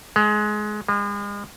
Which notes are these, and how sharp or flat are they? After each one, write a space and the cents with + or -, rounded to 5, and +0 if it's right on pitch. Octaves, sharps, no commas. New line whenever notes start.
G#3 +20
G#3 -40